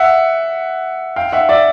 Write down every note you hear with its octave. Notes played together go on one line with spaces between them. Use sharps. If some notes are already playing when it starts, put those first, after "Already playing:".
Already playing: E5 F#5
F5 G5
E5 F#5
D5 E5